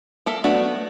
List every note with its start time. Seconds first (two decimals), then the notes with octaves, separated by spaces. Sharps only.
0.26 A#3 A4 E5
0.44 F#3 A3 B3 D4 F#4